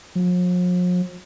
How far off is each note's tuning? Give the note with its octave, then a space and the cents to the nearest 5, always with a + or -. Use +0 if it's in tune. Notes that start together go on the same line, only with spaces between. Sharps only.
F3 +45